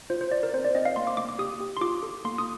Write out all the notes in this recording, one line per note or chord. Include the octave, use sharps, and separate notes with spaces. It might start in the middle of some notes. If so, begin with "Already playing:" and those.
F4 C5
C5
F4 D5
A#4
C4 C5
D5
C4 D#5
F5
A#3 C6
D6
A#3 D6
D6
G4 D#6
G4
C6
F4 D6
A4
A#3 C6
D#6